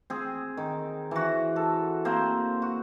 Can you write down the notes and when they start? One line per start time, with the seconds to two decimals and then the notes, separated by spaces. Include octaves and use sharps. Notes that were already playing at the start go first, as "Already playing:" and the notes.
0.10 C4 G#4
0.57 D#3
1.11 E3 F#4
1.56 A4
2.05 A#3 C4 C5
2.62 F#4